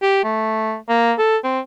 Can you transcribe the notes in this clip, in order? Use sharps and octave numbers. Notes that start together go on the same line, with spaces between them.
G4
A3
A#3
A4
C4